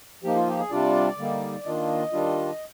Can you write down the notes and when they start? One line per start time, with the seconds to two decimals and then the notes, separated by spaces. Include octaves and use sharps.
0.23 F3 A#3 D#4 G4
0.36 F4
0.47 G4
0.59 G#4
0.71 C3 G3 D4 F4 D5
1.18 D3 G3 A#3 D#4
1.65 D#3 A#3 D4 F4 D#5
2.13 D#3 G3 D4 F4